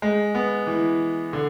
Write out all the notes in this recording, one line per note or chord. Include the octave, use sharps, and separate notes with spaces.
G#3
B3
E3
D3